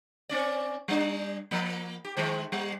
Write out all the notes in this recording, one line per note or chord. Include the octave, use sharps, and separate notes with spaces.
C4 C#4 D5
G3 D4
F3 A#3
G4
D#3 G#3 C5
G3